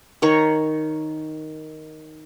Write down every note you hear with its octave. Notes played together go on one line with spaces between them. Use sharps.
D#3 C#5 A#5